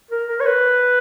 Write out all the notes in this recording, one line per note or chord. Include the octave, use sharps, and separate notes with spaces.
A#4
A#4
C#5
B4